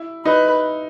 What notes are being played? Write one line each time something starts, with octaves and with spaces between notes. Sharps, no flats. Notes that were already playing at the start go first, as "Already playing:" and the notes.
Already playing: E4
D#4 B4